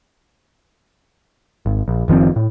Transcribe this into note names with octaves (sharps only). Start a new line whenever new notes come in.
G#1
A#1
F#1 D#3 F3 C4
A2